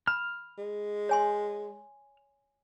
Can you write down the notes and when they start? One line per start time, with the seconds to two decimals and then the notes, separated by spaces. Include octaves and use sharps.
0.07 B5 F6
0.58 G#3
1.09 C#5 G#5 C6